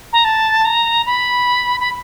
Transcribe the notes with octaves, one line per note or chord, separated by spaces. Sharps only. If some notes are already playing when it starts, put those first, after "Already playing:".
A#5
A5
A#5
B5
B5